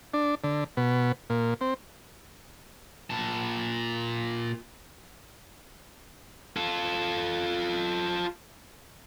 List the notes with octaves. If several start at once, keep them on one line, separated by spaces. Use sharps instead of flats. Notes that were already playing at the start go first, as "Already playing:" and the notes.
D4
D3
B2
A#2
C4
A#2 A5
F4 A4